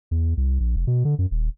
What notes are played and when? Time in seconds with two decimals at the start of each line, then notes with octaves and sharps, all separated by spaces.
0.11 E2
0.37 C2
0.60 A#1
0.76 F1
0.87 B2
1.05 D3
1.19 F#2
1.31 D#1